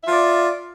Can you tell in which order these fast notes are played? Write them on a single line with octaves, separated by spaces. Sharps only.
E5 F4 D5